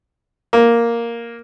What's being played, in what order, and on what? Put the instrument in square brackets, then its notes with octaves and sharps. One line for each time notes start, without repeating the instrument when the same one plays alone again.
[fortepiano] A#3